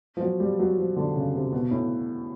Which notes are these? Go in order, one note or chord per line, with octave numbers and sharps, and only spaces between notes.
F3
F#3
G3
F#3
F3
D3
C#3
C3
B2
A2